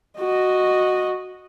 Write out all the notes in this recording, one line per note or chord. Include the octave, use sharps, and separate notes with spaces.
F#4 D#5